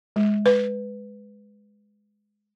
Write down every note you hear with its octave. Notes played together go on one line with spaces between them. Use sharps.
G#3
B4